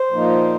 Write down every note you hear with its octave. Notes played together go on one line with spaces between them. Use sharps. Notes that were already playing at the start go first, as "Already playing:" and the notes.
Already playing: C5
A#2 F3 A#3 D#4